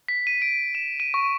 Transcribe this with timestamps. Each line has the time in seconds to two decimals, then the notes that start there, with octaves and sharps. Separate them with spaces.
0.08 B6
0.27 D#7
0.42 D7
0.75 E7
1.00 D#7
1.14 C#6